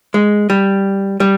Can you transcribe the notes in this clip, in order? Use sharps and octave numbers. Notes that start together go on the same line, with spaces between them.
G#3
G3
G3